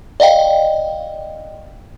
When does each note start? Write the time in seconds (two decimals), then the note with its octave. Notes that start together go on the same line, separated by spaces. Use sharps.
0.20 D5 D#5 F5 G5